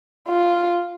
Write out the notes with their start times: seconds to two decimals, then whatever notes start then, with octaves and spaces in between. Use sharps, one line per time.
0.29 F4